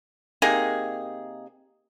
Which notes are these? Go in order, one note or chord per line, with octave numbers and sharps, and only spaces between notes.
C3 A#3 D#4 G#4